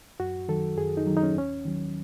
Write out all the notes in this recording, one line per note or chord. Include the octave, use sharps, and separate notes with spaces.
F#2 F#4
D#3 F#3 A4
F#2 G#4
D#4
D#3 F#3
D#4
C#4
D#2 C#4
D#3 F#3